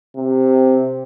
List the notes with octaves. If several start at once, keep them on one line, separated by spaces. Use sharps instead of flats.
C3